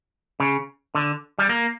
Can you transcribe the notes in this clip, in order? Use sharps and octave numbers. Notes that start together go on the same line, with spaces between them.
C#3
D3
G3
A#3